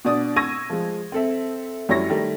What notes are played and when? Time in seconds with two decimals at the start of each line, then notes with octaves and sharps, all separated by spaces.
0.05 B2 D4 D5 D#6
0.36 C#6 E6 G#6 A#6 D#7
0.70 F3 G#3
1.12 C4 A4 E5
1.89 F#2 G3 E4 C#5 A#6
2.10 D#3 G3 A3